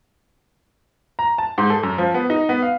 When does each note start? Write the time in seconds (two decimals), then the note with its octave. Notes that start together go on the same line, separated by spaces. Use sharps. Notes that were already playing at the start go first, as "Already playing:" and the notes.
1.19 A#5
1.38 A5
1.58 G#2
1.70 A4
1.83 F#2
1.98 F3
2.14 B3
2.30 D#4
2.49 B3
2.62 F5